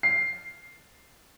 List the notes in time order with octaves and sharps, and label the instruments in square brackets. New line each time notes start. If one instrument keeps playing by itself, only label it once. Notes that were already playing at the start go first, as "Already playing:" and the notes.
[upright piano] C7